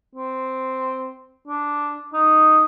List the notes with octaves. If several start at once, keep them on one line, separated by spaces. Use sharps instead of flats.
C4
D4
D#4